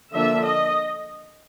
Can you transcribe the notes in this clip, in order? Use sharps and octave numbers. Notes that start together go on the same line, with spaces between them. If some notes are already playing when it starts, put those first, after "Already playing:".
D3 F3 A#3 D4 E5
D#5